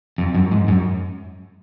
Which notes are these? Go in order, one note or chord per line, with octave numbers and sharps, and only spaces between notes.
F2
F#2
G#2
F#2